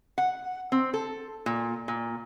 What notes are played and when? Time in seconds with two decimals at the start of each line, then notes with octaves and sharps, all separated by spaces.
0.18 F#5
0.72 C4
0.94 A4
1.46 A#2
1.88 A#2